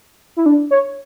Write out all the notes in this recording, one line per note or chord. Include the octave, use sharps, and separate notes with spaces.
E4
D4
C#5